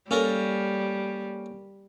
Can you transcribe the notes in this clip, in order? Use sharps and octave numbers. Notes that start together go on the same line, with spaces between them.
G3 A#3 C#4 A4 A#4